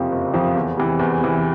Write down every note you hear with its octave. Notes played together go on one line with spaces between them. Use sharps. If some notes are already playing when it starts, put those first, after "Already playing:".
Already playing: F#1 F2 C3 F3
F#1
F2 C3 F3
E2
C3 E3
E2
C3 E3